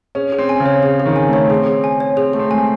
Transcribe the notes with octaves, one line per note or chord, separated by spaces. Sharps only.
C#4 G#4
G#4
C4
G#5
C#3
C#5
G#4
G#4
D#3
G#5
A3 C#5
C#4
C4 G#4
G#4
G#5
C#5
C4 G#4
A3 G#4
C4
G#3 G#5